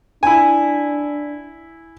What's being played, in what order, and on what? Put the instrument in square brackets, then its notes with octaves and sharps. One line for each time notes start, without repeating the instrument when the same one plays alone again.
[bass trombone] D4 [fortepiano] E4 G#5